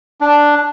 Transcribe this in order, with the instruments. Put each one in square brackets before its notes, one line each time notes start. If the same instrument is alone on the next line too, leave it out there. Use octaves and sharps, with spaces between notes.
[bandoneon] D4